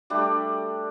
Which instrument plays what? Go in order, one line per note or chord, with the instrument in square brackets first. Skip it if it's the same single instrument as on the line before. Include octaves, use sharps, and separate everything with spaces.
[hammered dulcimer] G3 A3 D4 G4